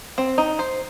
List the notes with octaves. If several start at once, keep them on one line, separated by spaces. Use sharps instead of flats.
C4
D#4
C5